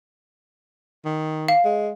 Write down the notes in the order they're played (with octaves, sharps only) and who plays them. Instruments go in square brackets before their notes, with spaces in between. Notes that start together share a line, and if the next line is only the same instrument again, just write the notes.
[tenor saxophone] D#3
[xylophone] F5
[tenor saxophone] G#3